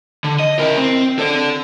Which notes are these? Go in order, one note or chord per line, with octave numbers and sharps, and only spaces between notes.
D3
D#5
E4 A#4
C4
A4 D5